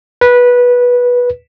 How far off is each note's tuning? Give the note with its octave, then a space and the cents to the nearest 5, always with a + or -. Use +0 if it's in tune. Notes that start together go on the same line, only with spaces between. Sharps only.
B4 -15